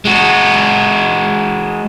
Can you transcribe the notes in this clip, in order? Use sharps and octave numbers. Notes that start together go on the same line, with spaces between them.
G#3 F#4